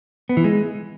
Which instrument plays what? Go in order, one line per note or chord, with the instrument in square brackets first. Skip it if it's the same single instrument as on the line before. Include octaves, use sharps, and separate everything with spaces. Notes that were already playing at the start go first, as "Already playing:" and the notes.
[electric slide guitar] B3
E3
G#3